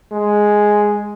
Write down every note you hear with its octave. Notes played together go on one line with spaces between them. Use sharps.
G#3